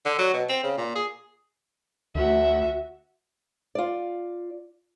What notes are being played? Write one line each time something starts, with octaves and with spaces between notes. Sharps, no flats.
D3
F#3
B2
C4
C#3
A#2
G#4
D2 F#4 E5
F4 D5